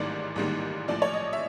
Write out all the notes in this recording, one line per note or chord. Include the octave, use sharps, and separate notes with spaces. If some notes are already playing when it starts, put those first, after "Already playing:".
Already playing: A1 G#2 D#3 G3 A#3 D5
A1 G#2 D#3 G3 A#3
A#1 A2 F3 D5
C#5
D#5
E5